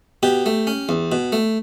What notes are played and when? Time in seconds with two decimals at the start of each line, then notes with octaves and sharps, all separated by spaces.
0.23 B2 G4
0.46 A3
0.67 C#4
0.89 E2
1.12 B2
1.32 A3